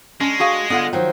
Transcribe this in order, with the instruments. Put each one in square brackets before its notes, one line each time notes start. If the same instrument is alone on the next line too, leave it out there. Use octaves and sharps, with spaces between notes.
[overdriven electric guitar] G#3 [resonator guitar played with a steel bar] C#4 [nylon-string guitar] D4
[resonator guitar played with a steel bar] F#4 G#4 F5
[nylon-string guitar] D3 [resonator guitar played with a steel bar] B3 F4 F#5
[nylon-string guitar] D#3 F3 F#3